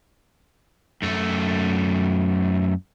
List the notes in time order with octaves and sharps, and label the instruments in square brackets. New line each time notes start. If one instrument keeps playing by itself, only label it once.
[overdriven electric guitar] F#2 A3